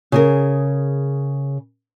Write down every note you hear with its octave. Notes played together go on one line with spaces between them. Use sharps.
C#3 G#4 A#4